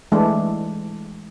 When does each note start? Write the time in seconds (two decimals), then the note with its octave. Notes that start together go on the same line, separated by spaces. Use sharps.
0.12 E3 G#3 A3 D4